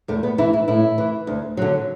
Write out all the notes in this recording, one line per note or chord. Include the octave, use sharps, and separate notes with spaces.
E2 A3
B3
E3 E4
E4
A2 E4
E3
D2
D3 F#3